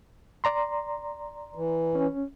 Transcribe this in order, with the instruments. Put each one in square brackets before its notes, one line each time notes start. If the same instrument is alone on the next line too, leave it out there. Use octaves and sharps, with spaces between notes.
[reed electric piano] D5 A#5 C6
[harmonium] E3
[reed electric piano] C#4